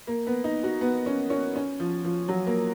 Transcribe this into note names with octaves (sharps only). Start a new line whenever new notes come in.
A#3
B3
D#4
F#4
B3
C#4
C#4
C#4
F3
F3
F#3
A#3